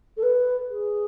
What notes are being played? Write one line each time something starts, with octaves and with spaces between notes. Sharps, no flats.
A4
B4
G#4